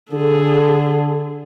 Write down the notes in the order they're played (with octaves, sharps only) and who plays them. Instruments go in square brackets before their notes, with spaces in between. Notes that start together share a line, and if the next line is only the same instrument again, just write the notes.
[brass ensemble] D3 [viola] G#4 A4